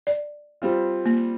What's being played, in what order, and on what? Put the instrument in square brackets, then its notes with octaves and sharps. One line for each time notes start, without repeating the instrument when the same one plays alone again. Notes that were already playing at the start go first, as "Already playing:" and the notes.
[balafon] D5
[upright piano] G3 C4 F4
[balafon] A#3